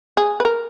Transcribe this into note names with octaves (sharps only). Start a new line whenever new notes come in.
G#4
B4
A#4